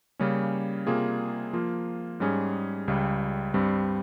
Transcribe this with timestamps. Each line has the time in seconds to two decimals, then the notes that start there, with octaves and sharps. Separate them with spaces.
0.19 C#3 G3 A#3 C#4
0.87 C3 G3 A#3 F4 G#4
1.53 F3 A#3 F4
2.20 G#2 G3 C#4 G#4
2.88 C#2 C#3 G3
3.54 G2 G3 C4